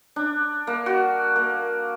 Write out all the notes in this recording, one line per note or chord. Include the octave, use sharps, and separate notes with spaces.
D4
A#3
F#4
A#3